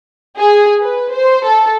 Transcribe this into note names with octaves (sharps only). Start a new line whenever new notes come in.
G#4
B4
C5
A4